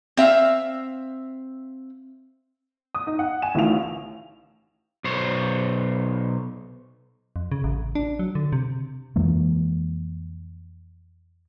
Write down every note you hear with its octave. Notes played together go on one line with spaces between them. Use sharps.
C4 E5 F5
D#6
D#4
F#5
G#5 E7
A1 A2 D#3 F4 F7
B1 C5 C#5
F2
C#3
A1
D4
F#3
D3
C3
F2 E3 G#3 A#3